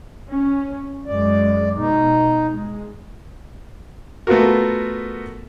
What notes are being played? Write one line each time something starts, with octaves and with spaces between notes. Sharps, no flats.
C#4
F#2 G#3 D5
B2 D#4
G#3
A3 B3 F4 F#4 A#4